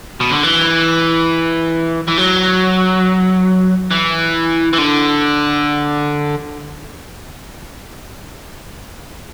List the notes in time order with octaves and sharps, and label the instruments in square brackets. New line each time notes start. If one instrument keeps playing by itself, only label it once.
[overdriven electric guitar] B2
D3
E3
E3
F#3
E3
E3
D3